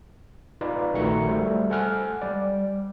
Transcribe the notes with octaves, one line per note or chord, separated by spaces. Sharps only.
D#4 F4 B4 D5
A#1 D#3 A3 F#4 A#5 C#7
G3 A3 C5
A4 C5 F#5 G#5 F6 F#6
G3 D5